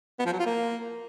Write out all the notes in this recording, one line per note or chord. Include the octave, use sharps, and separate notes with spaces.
B3
F3
F#3
F4
A#3